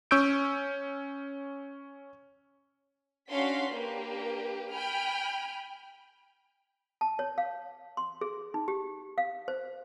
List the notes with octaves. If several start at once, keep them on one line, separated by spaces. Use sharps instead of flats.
C#4 C#6 E6 G6 D7
C#4 D4 F#4 F5 C6 B6
A#3 D4 G4 B4
G5 G#5 B5 F6
A5
C#5
F5
C6
G#4
D#4
G4
F5
C5